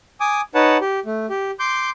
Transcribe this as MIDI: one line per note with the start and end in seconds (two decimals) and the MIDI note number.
0.21 0.41 80
0.21 0.41 86
0.21 0.41 87
0.55 0.77 63
0.55 0.77 71
0.55 0.77 73
0.55 0.77 78
0.55 0.77 81
0.81 1.00 67
1.06 1.26 57
1.30 1.51 67
1.60 1.90 84
1.60 1.90 86
1.60 1.90 91